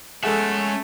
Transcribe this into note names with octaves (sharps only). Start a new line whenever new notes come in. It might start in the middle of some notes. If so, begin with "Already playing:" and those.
G#3 A3 C#4 G#4 A4 D#5 E5 F#5